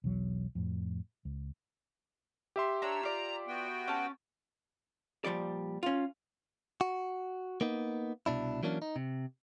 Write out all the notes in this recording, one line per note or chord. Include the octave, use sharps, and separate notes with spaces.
B1 E2 F#3
F2 A2
C#2
G4 E5 C6
D4 C#5 A#5 E6
F4 D5 A#5
B3 F#4 G5
C#4 A5
A#2 F3 G3 D5
C#4 F4
F#4
A#3 B3 D#4
C2 B2 D4 E4
E3 F#3 A#3 C#4 D4
D#4
C3